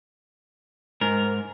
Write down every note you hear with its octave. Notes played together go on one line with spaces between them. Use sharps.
G#2 A#4